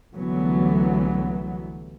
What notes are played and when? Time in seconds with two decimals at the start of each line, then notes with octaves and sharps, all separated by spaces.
0.13 C2 D3 E3 F#3 A3 B3